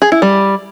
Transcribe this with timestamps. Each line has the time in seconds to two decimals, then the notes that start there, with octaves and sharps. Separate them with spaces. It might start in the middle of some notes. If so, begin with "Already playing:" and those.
0.02 G#4
0.12 E4
0.22 G3